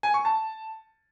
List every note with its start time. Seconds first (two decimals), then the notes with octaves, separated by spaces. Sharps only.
0.03 G#5
0.14 C#6
0.25 A5